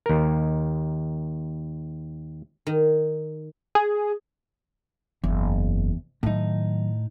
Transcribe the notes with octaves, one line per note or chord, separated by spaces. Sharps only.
D#2 A#4
D#3
G#4
F#1 E2
A2 D#3 F#3 D#4